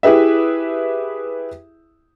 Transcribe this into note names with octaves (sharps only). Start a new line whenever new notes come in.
E4 G4 G#4 B4 E5